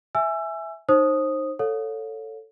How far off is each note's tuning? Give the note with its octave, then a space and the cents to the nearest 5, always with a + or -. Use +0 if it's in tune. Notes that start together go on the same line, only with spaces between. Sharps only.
E5 +0 G#5 +0 E6 +25
D#4 -15 C5 +30 D#6 -5
A4 +10 C#5 +0 F5 +35